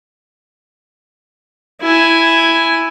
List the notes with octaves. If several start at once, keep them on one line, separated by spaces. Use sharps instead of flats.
E4 G#5